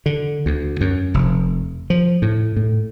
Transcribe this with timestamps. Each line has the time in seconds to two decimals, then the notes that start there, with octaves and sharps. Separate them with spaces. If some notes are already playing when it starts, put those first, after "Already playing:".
0.06 D3
0.46 D2
0.81 F#2
1.14 F1
1.90 F3
2.22 A2
2.56 A2